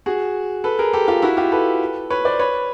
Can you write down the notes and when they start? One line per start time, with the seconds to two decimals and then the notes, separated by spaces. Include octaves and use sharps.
0.06 F#4 G#4
0.64 A4 B4
0.79 G#4 A#4
0.93 G4 A4
1.08 F4 G4
1.22 E4 F#4
1.37 F4 G4
1.52 A4 B4
2.10 B4 C#5
2.25 C5 D5
2.39 B4 C#5